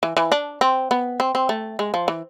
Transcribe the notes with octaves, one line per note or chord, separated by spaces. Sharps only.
E3
E3
D4
C4
B3
C4
C4
A3
G#3
F3
E3